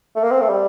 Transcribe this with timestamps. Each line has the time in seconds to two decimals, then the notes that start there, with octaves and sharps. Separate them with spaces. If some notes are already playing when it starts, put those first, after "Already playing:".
0.15 A3
0.23 A#3
0.31 C4
0.41 A3
0.49 G3